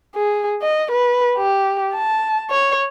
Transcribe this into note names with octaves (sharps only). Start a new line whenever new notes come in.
G#4
D#5
B4
G4
A5
C#5